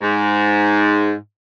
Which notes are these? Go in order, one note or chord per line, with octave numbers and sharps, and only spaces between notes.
G#2